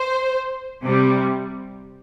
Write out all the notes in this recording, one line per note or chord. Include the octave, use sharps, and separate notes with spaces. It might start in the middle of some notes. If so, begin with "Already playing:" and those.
Already playing: C5
C3 G3